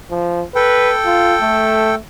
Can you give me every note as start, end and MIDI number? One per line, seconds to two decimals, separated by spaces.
0.11 0.43 53
0.55 1.95 69
0.55 0.92 71
0.55 1.95 79
1.06 1.35 65
1.42 1.98 57